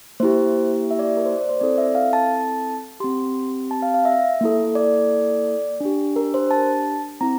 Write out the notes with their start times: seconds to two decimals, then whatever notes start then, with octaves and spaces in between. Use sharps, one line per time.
0.20 A#3 E4 G4 C5
0.91 E5
0.99 D5
1.17 A#4
1.26 C5
1.37 D5
1.49 C5
1.60 C4 E4 A4 D5
1.78 E5
1.95 F5
2.13 A5
3.00 C4 G4 C6
3.71 A5
3.82 F5
3.94 F5
4.05 E5
4.41 A#3 E4 A4
4.75 D5
5.81 D4 G4
6.16 A#4
6.34 C5
6.51 A5
7.21 C4 E4 A#5